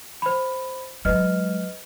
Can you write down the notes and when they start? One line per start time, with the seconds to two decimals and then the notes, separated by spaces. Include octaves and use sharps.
0.22 C5 B5
1.05 F#3 G#3 B4 D#5 F6